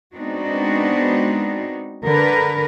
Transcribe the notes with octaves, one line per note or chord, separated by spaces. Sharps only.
G#3 B3 C4 D4 D#4 F#4
D3 A#4 B4